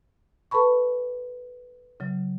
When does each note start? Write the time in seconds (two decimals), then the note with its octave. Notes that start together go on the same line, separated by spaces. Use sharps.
0.51 A4 B4 A5 B5 C#6
2.00 C#3 F#3